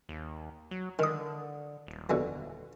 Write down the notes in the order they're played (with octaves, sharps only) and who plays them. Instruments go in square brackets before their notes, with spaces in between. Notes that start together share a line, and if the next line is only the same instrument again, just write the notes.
[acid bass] D#2
F#3
[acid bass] D3 [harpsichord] D#3 D#6
[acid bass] D#1
[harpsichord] F2 B2 D3